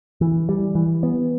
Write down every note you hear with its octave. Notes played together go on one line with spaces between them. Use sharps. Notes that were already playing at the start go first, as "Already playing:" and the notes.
E3
G3
E3
B3